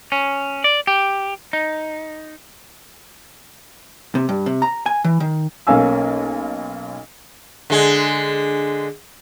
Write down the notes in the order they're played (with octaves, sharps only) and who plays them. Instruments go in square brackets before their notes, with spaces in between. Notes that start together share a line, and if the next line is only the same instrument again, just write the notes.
[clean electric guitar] C#4
D5
G4
D#4
[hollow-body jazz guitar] C3
G2
C3
A#5
G#5
E3
D#3
[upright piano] B1 A#3 C#4 F5 G#5 E6
[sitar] D3 G#3